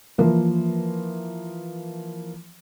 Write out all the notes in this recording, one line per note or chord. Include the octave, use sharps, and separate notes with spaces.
E3 F3 A#3